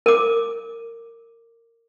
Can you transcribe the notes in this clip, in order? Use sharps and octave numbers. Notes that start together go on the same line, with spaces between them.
A#4 D6